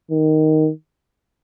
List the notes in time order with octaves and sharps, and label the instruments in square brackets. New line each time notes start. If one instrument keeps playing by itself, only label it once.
[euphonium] D#3